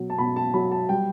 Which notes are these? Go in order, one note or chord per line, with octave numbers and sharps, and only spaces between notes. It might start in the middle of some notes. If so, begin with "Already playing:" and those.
Already playing: B2 F#3
A5
B2 B5
A5
F#3 B5
A5
G3 G5